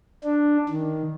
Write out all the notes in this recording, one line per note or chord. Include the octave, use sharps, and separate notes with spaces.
D4
D#3